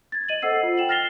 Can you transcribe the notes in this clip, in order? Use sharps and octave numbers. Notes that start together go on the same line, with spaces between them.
G#6 A6
D#5 D#7 F#7
A4 C5 F#5 E6 C7
F4
G5 E7 F#7
F6 A6 A#6 C7 F7 G7